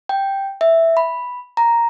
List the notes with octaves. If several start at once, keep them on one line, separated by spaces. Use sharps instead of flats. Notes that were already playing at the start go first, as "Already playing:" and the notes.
G5
E5
B5
A#5